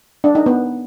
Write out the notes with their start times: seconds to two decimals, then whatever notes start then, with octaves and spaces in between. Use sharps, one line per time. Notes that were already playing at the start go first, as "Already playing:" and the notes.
0.24 D4
0.35 D#4
0.46 B3